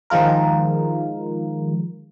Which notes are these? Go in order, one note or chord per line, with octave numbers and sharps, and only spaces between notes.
D#3 F3 G#3 F4 A#4